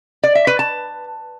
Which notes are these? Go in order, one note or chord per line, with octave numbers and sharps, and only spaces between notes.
D5
E5
B4
A5